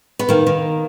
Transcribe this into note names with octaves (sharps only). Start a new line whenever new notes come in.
B3
D#3 A#3
D#3